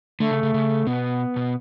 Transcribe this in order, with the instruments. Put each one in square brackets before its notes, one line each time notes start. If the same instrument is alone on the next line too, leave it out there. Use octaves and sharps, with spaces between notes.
[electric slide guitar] D3 [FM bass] A3
[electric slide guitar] C#3
C#3
C#3
[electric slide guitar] B2 [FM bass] B3
[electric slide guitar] B2